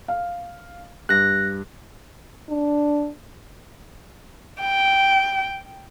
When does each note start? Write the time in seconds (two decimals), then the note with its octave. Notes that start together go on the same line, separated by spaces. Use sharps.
0.08 F5
1.09 G2 F#6 A#6
2.49 D4
4.61 G5